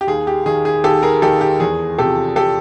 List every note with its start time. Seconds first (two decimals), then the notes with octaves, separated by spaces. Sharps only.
0.01 G4
0.07 D#2 G#4
0.27 G4
0.46 D#3 G#4
0.65 G#4
0.84 D#2 G4 A4
1.03 G#4 A#4
1.22 D#3 G4 A4
1.41 G4
1.60 E2 G#4
1.98 C3 F3 G4 A4
2.36 G4 A4